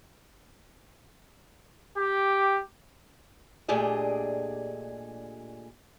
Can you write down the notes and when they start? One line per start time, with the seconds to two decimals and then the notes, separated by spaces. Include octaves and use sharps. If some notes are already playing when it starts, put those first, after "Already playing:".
1.97 G4
3.68 A#2 A3 D4 G4 G#4 D#5